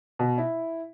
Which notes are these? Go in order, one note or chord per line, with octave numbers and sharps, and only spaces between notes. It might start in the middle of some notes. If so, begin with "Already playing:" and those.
B2
E4